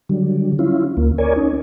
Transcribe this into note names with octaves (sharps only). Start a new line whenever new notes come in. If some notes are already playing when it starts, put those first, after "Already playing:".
D3 F#3 G3
C#4 E4 F4
D2 A#3
A#4 C#5 D5 G#5
C#4 D#4